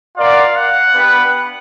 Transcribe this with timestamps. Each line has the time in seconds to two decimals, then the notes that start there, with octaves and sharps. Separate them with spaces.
0.16 F4 A#4 D5 F5 F#5
0.56 F#5
0.94 B3 D4 G4 B4